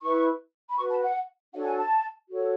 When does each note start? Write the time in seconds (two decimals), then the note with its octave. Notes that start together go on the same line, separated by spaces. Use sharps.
0.02 E4 B4 C#6
0.70 B5
0.77 F#4 B4 C#6
0.90 A5
1.03 F#5
1.53 D4 F#4 A4 C#5 F#5
1.66 G#5
1.78 A5
2.30 F#4 A4 C#5